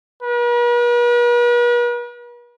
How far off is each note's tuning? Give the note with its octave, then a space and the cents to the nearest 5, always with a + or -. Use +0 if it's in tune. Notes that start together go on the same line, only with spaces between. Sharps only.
B4 -45